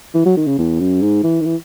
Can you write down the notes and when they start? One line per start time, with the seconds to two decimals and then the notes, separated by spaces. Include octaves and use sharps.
0.14 E3
0.25 F#3
0.37 D#3
0.46 C#3
0.58 E2
0.80 F#2
1.01 G#2
1.23 E3
1.41 D#3
1.45 E3